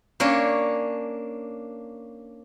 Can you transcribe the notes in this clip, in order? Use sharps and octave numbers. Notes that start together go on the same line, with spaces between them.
A#3 C#4 D4 C#5